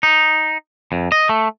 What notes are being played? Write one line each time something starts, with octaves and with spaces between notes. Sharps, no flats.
D#4
F2
D#5
A3